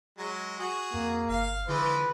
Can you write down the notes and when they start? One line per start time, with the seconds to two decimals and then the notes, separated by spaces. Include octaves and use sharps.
0.18 F#3 G#3
0.59 F#4 G#4
0.94 F2 A#3
1.29 G1 F5
1.68 D3 E3 F3 G#3 B4